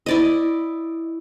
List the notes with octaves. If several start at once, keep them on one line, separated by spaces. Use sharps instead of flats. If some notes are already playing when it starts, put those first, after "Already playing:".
E4 D5 D#5